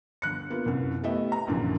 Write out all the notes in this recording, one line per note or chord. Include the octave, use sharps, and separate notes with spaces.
G1 F#6 C#7
A#3 B3 F4
C2 F#2
A3 B3 E4 G4 D#5 E5
A#5
A#1 F#2 A#2 D3 E3